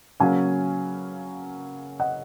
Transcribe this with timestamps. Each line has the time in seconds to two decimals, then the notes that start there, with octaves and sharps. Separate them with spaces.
0.20 C#3 F#3 A#3 C#4 F5 G#5
2.00 D#5 F#5